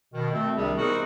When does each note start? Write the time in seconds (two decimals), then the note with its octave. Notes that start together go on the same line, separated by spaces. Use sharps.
0.14 B2 D#3
0.34 A3 C4
0.57 C2 C3 D#3 G3 D4 G#4
0.78 B3 C4 D#4 F#4 G#4 A#4